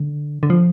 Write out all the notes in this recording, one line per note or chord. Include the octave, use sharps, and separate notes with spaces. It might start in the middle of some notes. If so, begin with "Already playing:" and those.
Already playing: D3
D3
F3